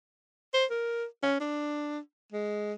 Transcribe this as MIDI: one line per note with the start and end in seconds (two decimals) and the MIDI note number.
0.54 0.65 72
0.71 1.04 70
1.23 1.40 61
1.40 1.99 62
2.32 2.74 56